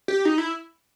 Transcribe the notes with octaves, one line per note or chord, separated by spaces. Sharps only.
G4
D#4
E4